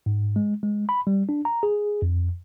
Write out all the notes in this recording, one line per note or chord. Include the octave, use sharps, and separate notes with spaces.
G#2
G#3
G#3
B5
G3
D4
A#5
G#4
F2